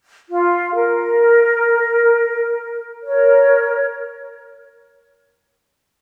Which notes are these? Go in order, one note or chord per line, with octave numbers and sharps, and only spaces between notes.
F4
A#4
A#4 C#5